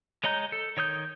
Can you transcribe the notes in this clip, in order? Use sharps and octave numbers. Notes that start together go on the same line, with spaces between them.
G#3 C#5 D#5 A#5 G6
A4
D#3 C#5 D#6 G6